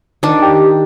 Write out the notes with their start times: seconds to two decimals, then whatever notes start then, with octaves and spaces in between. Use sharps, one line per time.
0.23 D#3 D4
0.42 G4